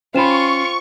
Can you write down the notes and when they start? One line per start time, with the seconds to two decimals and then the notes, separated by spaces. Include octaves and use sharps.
0.14 C#4 F4 C5 G5 B5 C#6 E7